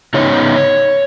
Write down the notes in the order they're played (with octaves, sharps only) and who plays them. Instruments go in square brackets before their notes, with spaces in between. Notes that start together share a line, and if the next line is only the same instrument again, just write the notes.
[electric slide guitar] C#3 B3 D#4 C#5